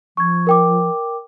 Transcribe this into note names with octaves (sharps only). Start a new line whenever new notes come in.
F3 C#6 G#6
A#4 G5 D6